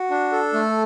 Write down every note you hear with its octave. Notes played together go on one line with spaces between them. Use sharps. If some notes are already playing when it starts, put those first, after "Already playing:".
Already playing: F#4
D4
A4
A3